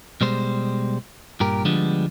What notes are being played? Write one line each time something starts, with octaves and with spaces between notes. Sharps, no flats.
B2 G3 G#3 C5
G2 A#2 G4 A#4
D3 F3 G3 G#3 B3 D4